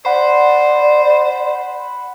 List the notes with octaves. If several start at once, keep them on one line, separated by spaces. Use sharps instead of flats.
C5 D5 F#5 B5 C6